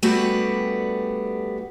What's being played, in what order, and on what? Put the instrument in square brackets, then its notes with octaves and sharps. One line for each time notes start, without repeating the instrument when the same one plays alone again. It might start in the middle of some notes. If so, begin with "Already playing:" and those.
[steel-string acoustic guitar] G3 A3 B3 D4 F#4 G4